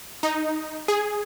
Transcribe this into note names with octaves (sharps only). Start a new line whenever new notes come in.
D#4
G#4